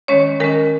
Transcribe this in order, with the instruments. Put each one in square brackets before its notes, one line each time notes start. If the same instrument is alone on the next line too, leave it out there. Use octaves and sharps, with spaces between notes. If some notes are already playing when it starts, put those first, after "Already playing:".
[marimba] D#3 G#3 C#4 C#5
D#3 G#3 C#4 A#4